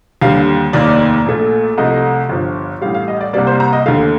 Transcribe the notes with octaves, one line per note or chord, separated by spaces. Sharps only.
D#2 D3 G3 F5
F1 D#2 D#3 A#3 D5
A#1 A#2 A3
C2 C3 F3 A3 D#5
G1 G2 F3
A1 A2 G3 F5
F5
D#5
D5
C2 C3 G3 A#3 D5
C5
A#5
D#5
D#2 D3 A3 F5